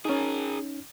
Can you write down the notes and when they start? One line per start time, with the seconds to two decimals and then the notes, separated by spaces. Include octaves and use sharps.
0.05 C#4 D#4 G#4 A#4